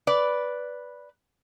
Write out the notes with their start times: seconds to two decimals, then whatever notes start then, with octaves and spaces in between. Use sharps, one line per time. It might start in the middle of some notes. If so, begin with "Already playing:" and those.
0.07 B4 D5